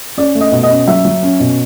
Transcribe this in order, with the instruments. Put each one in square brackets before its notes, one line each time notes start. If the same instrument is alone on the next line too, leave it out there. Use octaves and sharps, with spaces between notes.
[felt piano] C#4 D5
A3
D#5
B2
D#5
C#4
F#3 E5
F#3
C#4
B2